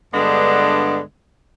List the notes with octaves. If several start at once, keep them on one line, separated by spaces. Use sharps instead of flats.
G2 D3 G#3 B3 D4